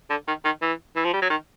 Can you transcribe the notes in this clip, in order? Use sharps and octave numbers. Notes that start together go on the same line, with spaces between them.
D3
D#3
D#3
E3
E3
F3
G3
F#3
D#3